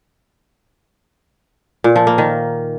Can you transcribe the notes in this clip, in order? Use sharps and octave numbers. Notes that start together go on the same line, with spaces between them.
A#2
F3
A#3
D#3